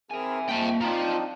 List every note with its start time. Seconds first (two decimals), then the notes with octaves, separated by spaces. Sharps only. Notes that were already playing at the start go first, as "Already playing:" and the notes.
0.11 C4 G#4 A#4 E5 G#5
0.49 F2 F3 G#3 A#3 E5 G5 A5
0.81 F3 C4 D4 D#4 G5 A#5